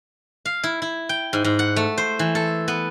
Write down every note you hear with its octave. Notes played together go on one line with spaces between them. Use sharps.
F5
E4
E4
G5
G#2
G#2
F#5
A3
C5
E3
A4
B3